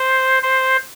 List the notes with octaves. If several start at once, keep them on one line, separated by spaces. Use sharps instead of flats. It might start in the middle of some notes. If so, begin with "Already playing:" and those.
Already playing: C5
C5